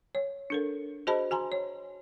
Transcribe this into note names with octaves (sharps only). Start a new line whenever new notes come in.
C#5
D4 A4 A#4
F#4 G#4 C5 D#5 A5 B5
F#4 G#5 A#5 C6
C#5